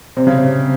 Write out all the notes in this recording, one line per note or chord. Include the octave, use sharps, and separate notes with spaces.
C3
C#3
C3